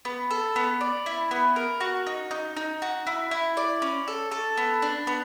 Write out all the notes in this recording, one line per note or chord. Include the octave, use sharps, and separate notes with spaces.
B3
A4
B3
D5
E4
B3
A#4
F#4
D#4
D#4
D#4
F#4
E4
E4
D5
C#4
A4
A4
B3
D4
B3